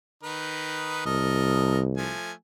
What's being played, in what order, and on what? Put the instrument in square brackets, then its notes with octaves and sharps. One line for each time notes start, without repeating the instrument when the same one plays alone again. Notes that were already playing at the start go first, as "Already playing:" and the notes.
[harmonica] D#3 D#4 B4
[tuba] C2 [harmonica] A4 A#4 D#5
[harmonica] F3 A3 G#5